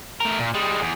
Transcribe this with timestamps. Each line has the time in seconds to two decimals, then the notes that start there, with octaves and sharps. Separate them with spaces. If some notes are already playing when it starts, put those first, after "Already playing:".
0.21 A3 A#4
0.39 A#2
0.54 G3 G#3
0.81 E2